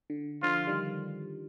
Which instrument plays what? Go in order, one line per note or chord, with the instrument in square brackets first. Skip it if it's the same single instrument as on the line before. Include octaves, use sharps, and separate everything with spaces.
[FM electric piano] D3
[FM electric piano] D3 F3 [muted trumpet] F4
[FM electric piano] D#3 G3